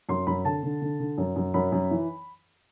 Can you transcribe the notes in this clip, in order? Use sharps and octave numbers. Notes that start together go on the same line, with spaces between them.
F#2 C6
F#2 B5
D3 A5
D3
D3
D3
F#2
F#2
F#2 B5
F#2
E3